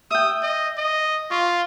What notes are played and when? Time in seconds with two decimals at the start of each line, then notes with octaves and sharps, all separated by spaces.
0.11 E5 G5 D#6
0.43 D#5
0.77 D#5
1.31 F4 C#6